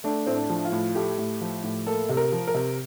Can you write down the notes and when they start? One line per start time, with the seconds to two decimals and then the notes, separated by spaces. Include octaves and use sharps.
0.04 A3 D4
0.27 A2 C4
0.34 D4
0.50 F3
0.65 F4
0.72 A2
0.95 A3 G4
1.18 A2
1.41 F3
1.63 A2
1.87 A#3 A4
2.09 C3
2.17 A#4
2.32 F3
2.47 A#4
2.54 C3